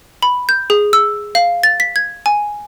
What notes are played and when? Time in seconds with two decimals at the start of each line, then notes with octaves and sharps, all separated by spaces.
0.23 B5
0.49 G6
0.70 G#4
0.93 E6
1.35 F5
1.63 A6
1.80 B6
1.96 G#6
2.26 G#5